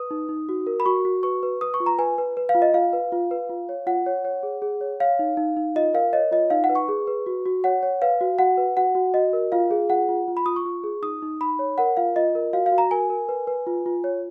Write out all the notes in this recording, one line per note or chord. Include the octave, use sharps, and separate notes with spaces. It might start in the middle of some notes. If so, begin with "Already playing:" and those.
Already playing: B4 D#6
D#4
D#4
F#4
A#4
B5
F#4 C#6
F#4
B4 C#6
B4
B4 D#6
C#6
F4
A#5
B4 G#5
B4
B4
F5
F4
D#5
F4 F5
B4
F4
B4
F4
C#5
F4 F#5
C#5
C#5
G#4
G#4
C#5
C#5 F5
D#4
D#4
D#4
F4 D#5
A#4 F5
C#5 D#5
F4 D#5
D#4 F5
F#5
B4
C#6
G#4
B4
F#4
F#4
C#5 F#5
C#5
B4 F5
F#4
F#4 F#5
B4
F#4 F#5
F#4
F#4 D#5
A#4
F4 F5
G#4
F4 F#5
F4
F4
B5
F4 D#6
C#6
F4
G#4
D#4 D#6
D#4
D#4 B5
C#5
A#4 F#5
F4 F5
F4 D#5
A#4
F#4 F5
F5
F#4
A#5
A#4 G#5
A#4
B4
B4
F4
F4
C#5